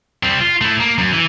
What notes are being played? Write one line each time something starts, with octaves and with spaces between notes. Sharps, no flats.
G3 C4
F4
A3 E4
A#3
F#2
E3